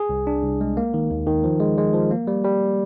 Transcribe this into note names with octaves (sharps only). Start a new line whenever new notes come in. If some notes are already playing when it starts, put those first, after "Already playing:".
Already playing: G#4
C2
D4
C2
G#3
A#3
D#3
D#2
D#3
F3
G#3
G#3
F3
A#3
G3
G3